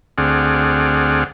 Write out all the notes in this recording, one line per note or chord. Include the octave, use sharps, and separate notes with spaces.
D2 C4 G#4 D5 F#5 F6